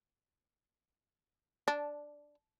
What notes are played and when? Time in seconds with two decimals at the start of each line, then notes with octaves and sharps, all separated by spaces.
1.68 D4